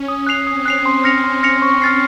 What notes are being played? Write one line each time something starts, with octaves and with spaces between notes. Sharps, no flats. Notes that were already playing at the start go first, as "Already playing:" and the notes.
Already playing: C#4
D#6
F#6 C7 F7
C4 D#6
F#6 C7 F7
C6
F6 A#6 C#7 F7
C6
F6 A#6 C#7 F7
C#6
F6 A6 C7